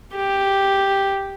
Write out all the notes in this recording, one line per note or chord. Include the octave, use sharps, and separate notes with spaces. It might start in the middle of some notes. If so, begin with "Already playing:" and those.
G4